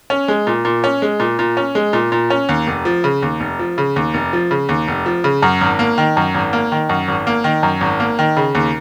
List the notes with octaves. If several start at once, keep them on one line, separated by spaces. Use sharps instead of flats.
C#4
G#3
A#2
A#2
C#4
G#3
A#2
A#2
C#4
G#3
A#2
A#2
C#4
D#2
F1
F3
C#3
D#2
F1
F3
C#3
D#2
F1
F3
C#3
D#2
F1
F3
C#3
F#2
G#1
A#3
D#3
F#2
G#1
A#3
D#3
F#2
G#1
A#3
D#3
F#2
G#1
A#3
D#3
C#3
D#2